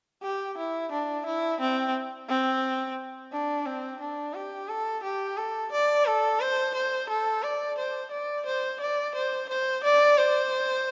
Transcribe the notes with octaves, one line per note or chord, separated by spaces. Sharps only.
G4
E4
D4
E4
C4
C4
D4
C4
D4
G4
A4
G4
A4
D5
A4
C5
C5
A4
D5
C5
D5
C5
D5
C5
C5
D5
C5